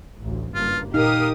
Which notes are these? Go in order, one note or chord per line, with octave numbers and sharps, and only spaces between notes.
A1 D2
F#1 G2 A#3 F4
A#2 D#4 G4 A#4 F5 D#6